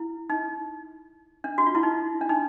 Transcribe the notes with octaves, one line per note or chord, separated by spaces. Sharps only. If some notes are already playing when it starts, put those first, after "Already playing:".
Already playing: E4
D#4
D4
F#4
F4
E4
D#4
D4
D#4